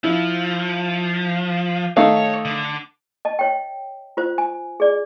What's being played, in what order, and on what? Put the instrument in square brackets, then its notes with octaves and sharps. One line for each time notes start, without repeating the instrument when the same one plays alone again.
[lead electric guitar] F3 [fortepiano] E4
[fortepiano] D#3 A3 D#4 [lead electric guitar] C#5 [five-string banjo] F5
[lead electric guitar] D3
[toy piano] D#5 A5
C#5 G5
F4 C5
G#5
G#4 D5